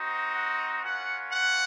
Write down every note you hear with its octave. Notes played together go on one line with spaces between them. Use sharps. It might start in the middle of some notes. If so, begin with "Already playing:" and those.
Already playing: C4 D#4 F#4
F#5
A#3 C#4 F4 F#5
F#5